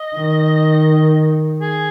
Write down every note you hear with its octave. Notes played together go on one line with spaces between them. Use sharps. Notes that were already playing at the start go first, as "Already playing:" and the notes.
Already playing: D#5
D#3
G#4